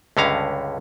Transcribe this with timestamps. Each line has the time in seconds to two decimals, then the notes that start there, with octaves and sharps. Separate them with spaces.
0.17 C#2 G2 D3 C#4 F5 A#5